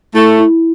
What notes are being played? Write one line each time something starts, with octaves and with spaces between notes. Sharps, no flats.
A3 E4
E4